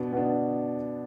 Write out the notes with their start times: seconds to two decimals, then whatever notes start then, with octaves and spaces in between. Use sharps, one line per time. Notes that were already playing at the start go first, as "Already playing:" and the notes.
Already playing: B2 B3 D4
0.13 B2 B3 D4